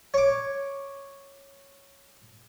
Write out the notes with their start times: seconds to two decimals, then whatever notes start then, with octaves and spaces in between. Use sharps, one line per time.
0.14 C#5 D6